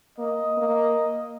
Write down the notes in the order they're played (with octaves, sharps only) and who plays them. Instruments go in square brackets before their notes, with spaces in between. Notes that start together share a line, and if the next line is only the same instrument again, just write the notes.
[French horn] A#3 [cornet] D#5
[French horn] A#3